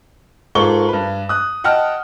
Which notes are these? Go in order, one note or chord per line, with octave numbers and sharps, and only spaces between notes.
G#2 F4 A4 A#4 C#6 G7
G2 B4
D#6 F#6
D#5 F#5 G5 A5 F6